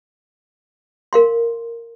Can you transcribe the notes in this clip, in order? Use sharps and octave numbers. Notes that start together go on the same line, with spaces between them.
A#4 F5 C6